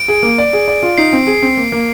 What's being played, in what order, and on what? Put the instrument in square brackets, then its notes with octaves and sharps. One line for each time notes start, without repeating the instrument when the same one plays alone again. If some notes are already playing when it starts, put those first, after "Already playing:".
Already playing: [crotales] D7
[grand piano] G#4
A#3
D5
G#4
D5
F4
[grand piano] D#4 [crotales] C7
[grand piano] C4
G#4
C4
A#3
A#3